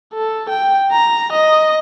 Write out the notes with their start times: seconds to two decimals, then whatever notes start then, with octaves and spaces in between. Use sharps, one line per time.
0.14 A4
0.49 G5
0.92 A#5
1.32 D#5